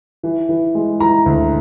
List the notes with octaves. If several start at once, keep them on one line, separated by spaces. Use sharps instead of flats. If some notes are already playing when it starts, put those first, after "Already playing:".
E3
E3
G#3
E3 A#5
D2